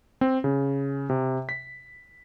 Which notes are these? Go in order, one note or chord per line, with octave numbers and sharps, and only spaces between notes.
C4
C#3
C3
B6